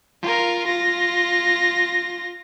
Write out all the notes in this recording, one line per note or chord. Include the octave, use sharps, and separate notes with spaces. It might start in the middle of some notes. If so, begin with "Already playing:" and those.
F4 A#4
F4 A#6